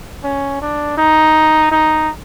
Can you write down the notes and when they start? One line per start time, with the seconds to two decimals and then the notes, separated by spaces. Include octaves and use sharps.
0.24 C#4
0.62 D4
0.97 D#4
1.71 D#4